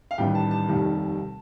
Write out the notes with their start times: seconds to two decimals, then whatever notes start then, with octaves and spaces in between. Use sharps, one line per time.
0.11 F5
0.18 A1 G2 D#3 G5
0.35 A5
0.51 A5
0.68 F1 D#2 D#3 G3